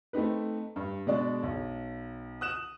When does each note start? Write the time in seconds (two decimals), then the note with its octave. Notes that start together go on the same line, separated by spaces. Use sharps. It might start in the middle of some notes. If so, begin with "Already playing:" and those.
0.13 A3 C4 D#4 B4
0.76 G2
1.07 B2 G#3 D4 D5
1.43 B1
2.41 D#6 F#6 E7